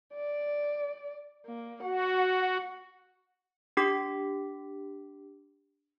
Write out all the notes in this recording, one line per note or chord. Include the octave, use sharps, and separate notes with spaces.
D5
A#3
F#4 F#5
D4 G4 D6 B6